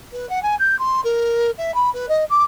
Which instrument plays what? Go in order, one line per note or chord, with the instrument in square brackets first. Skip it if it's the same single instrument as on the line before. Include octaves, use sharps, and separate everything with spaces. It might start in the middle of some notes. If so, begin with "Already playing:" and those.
[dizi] B4
F#5
G#5
G6
C6
A#4
E5
B5
B4
D#5
D6